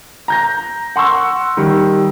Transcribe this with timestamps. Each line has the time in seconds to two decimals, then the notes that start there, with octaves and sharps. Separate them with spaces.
0.28 A#5 G6 A#6
0.96 F#5 C6 C#6 E6
1.57 D#3 G3